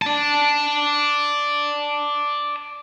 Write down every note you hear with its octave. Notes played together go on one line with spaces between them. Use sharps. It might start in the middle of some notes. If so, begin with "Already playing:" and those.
D5 A5